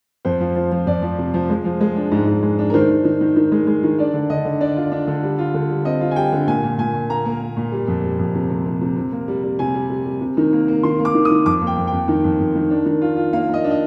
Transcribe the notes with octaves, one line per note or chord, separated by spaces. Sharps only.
F2 C5
F3
F3
F3
F2 D5
F3
C3
F3
G#3
F3
G#3
D4
G#2
G#2
G#3
D4
A#4
D#3 C5
D#3
D#3
D#3
D#3
G#3
G#3
D#3
D4 D5
D3
D3 D#5
D3
D4 D5
F4
D4
D3
G3
F4
D3
G3
C4 D#5
F4
G#5
G3 G5
D3
A#2 G#5
A#2
A#2 G#5
A#2
A#3 A#5
A#3
A#3
A#2
G3
F2
G3
F2
C3
C3
C3
C3
C3
A#3
G3
G3
C3 G#5
G3
G3
G3
C3
D#3
A#3
A#3
D#3 C6
A#3
D6
D#3
D#6
D#3
F2 D6
A#3
G5
F2
G5
F2
D#3
F2
F2
D#3
D4
D#3
F4
F4
A#3 F5
A#3
D#5
D4
D#5